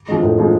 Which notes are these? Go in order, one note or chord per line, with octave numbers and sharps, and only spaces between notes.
F3 G#3
A2
F3 G#3